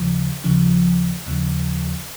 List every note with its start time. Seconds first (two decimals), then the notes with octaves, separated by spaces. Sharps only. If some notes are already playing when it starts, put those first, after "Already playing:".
Already playing: D#2 C#3 F3
0.44 D#2 C#3 F3
1.26 D#2 C#3 F3